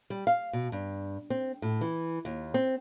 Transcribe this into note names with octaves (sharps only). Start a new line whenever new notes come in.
G3
F5
B2
G2
C4
A2
E3
D#2
C4